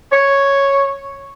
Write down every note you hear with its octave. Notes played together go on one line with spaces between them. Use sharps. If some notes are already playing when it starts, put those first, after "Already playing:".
C#5